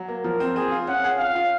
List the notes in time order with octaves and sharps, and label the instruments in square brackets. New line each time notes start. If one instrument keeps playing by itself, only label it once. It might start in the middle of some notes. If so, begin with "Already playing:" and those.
Already playing: [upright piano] F#3
A#3
[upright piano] F3 [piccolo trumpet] A#4
[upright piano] C4
[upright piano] C4 [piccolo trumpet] G#4
[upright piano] F4
[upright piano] C#4 [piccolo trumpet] F#5
[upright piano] G#4
[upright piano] C#4 [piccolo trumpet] F5
[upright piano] F4